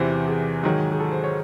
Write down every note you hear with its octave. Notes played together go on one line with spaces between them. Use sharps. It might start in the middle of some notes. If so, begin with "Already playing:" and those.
Already playing: E2 C3 E3 C5
G#4
G#2 D#3 F#3 G#4
G#4
A4
C5
C#5